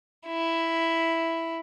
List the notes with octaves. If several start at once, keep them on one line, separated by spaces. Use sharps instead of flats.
E4